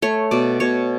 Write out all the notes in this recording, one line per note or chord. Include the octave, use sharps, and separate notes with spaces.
A3 C#5
B2 D5
B2 C#5